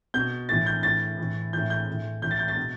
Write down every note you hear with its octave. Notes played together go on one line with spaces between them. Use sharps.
B2 G6
A2 E3 A6
G6
A2 E3 A6
A2 E3
A2 E3 G6
G6
A2 E3
A2 E3 G6
A6
G6
A6
B2